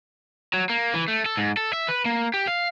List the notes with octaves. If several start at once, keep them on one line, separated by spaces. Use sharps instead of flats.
F#3
A#3
E3
A3
A4
G#2
A4
E5
B4
A#3
G4
F5